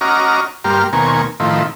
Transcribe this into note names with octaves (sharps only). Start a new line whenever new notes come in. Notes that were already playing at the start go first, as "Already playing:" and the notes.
C#4 F#4 D#5 A#5 D6 F6
G2 A#3 G4 C6 F6
D#2 B2 A#3 C4 G#5 C#6
A2 D#3 F3 C4 E4